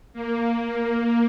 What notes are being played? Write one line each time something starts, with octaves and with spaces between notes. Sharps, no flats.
A#3